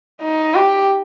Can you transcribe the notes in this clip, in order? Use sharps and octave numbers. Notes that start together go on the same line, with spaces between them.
D#4
G4